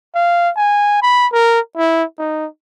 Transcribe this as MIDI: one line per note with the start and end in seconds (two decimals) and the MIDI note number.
0.15 0.50 77
0.56 0.98 80
1.02 1.27 83
1.33 1.60 70
1.77 2.04 64
2.18 2.47 63